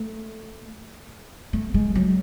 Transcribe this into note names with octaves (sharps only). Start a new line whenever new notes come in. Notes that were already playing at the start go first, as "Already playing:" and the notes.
Already playing: A3
A3
G#3
F#3